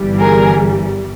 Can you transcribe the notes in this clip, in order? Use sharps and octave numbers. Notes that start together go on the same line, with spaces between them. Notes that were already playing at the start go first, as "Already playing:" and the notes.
Already playing: G1 G2 E3 G3
G#4 A#4